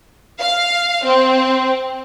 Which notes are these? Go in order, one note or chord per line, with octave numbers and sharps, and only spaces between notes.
F5
C4